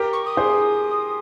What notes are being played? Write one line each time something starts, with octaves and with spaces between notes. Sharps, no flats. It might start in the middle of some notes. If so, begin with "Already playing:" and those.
Already playing: G4 A#4
C#6
D#6
G#4 C5